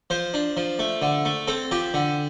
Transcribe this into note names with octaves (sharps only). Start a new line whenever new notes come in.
F3 C5
D4
F3
A3
D3
A3
C4 A4
F3 G4
D3